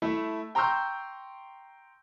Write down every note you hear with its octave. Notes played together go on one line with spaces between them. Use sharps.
A3 E4
G5 A#5 C6 C#6 E6 G6